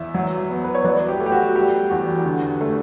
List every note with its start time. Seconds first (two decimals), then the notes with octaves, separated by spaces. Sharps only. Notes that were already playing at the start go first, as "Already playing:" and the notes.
Already playing: E2 E5
0.14 F#3
0.50 B3
0.64 B4
0.75 C#5
0.85 F#3 B4 D5
1.08 G4
1.20 A3
1.26 G4
1.32 F#4
1.55 G3 G4
1.90 E2 F#4
2.26 D3
2.61 A3